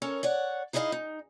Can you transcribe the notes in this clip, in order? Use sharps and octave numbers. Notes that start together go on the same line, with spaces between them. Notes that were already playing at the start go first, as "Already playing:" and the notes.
C#4 A4 A#4 C#5
C#5 D5 F#5
D#4 E4 G#4 B4 D#5 F5
D#4